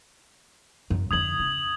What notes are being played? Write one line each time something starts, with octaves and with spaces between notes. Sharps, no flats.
F#2
F2 D3 D#6 G#6 F#7
C#3